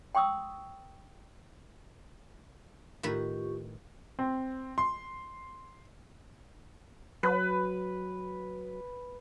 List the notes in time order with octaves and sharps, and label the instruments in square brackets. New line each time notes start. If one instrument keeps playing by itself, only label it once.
[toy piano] G5 C6 C#6 D#6 E6
[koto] A2 D#3 B4 [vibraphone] F4 G4 C#6
[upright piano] C4
C6
[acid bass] F#3 [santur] B4